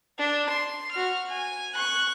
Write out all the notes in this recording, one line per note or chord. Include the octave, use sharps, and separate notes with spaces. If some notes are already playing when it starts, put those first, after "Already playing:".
D4
C6
F#4 F6
G#5
C#6 F#6